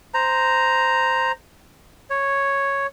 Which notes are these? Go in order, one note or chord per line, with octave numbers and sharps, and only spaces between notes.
C5 A#5
C#5